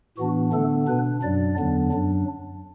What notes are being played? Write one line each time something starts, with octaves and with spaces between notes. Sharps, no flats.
A2 E3 B3 D4 F#4
D3 A3 B3 D4 A4
B2 B3 D4 B4
F#2 F#3 D4 D5
E2 D3 F#3 B3 D4
F#2 F#3 D4